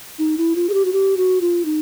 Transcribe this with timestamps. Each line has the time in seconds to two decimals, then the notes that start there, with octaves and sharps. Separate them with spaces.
0.19 D#4
0.38 E4
0.56 F4
0.69 G#4
0.74 G4
0.85 F#4
0.93 G4
1.17 F#4
1.41 F4
1.65 D#4